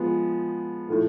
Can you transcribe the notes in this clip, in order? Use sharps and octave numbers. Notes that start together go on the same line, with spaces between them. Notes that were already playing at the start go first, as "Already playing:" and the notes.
Already playing: F3 G#3 B3
A2 F3 A3